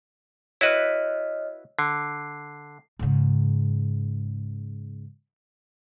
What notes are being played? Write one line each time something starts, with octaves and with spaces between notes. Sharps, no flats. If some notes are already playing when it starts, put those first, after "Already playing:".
E4 F#4 B4 C#5 D#5 F6
D3 C7
G#2 C#3